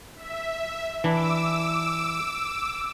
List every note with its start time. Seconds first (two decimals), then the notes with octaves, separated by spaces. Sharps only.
0.15 E5
1.04 E3 D4 E4 D6 E6